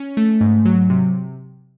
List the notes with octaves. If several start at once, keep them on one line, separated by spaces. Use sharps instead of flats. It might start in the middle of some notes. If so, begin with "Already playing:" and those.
Already playing: C#4
A3
G#2
F#3
C3